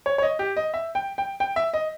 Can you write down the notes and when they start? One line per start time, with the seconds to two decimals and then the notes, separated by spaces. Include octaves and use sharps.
0.06 C#5
0.18 C#5
0.23 D#5
0.39 G4
0.57 D#5
0.74 E5
0.95 G5
1.18 G5
1.40 G5
1.56 E5
1.74 D#5